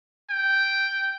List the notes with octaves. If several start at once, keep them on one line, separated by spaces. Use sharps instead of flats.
G5